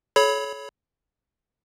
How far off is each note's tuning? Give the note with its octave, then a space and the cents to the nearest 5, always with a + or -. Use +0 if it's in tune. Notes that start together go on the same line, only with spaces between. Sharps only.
A4 -45 C#5 +5 B5 +0